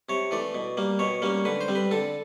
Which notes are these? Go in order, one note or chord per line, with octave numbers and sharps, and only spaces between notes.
C3 C#5
E3 A3 D5
B2
G3 A#3
B2 C#5
G3 A#3 C#4
D3 B4
C5
G3 C4
B4
D3 A4